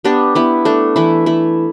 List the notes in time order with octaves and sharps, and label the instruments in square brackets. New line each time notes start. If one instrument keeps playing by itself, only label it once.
[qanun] B3 D4 G4
B3 E4
A3 D4
E3 E4
A3 E4